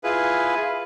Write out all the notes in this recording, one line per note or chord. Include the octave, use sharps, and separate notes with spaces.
E4 F4 G#4 B4